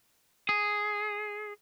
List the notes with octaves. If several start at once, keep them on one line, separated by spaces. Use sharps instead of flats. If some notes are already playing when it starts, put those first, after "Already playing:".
G#4